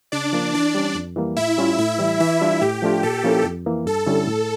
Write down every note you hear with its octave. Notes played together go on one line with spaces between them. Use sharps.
C#3 D4 D5
F3 A#3 D4
E3 D4 D5
G3 C#4
F2
E3 G3 A#3
A2 E4 E5
G3 C#4 F4
A2 E4 E5
E3 G3
E3 E4 E5
G3 D4 F4
A2 G4
F3 A3 D4 F4
A#2 A4
F3 A#3 C#4 E4
F2
E3 A#3
G2 A4
D3 G3 C#4 E4
A2